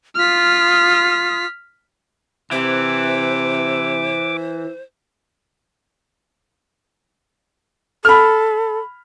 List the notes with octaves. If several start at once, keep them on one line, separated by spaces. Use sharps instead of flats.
F4 D#6 F6 B6
C3 E3 C5 D6
A4 B5 F6